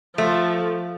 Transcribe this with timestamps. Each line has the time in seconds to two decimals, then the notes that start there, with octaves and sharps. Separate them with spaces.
0.17 F3 A3